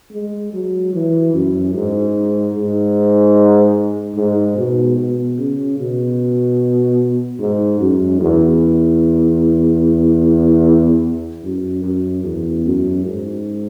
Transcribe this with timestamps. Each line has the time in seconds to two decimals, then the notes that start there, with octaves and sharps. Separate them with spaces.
0.12 G#3
0.53 F#3
0.94 E3
1.33 F#2
1.74 G#2
2.54 G#2
4.16 G#2
4.57 B2
4.97 B2
5.37 C#3
5.78 B2
7.39 G#2
7.79 F#2
8.21 E2
11.43 F#2
11.84 F#2
12.24 E2
12.65 F#2
13.05 G#2